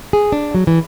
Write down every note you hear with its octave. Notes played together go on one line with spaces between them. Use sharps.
G#4
D4
F#3
E3